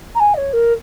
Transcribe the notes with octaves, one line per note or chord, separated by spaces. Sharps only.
A#5
G#5
D#5
C#5
A#4